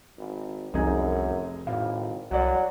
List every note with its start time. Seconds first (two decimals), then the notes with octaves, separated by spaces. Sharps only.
0.18 G#1
0.74 F1 C2 F#2 D#4 G#4
1.67 G#1 A2 F5
2.31 C2 F#3 D5 F#5